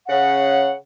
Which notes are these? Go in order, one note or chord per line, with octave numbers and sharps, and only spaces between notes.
C#3 F#5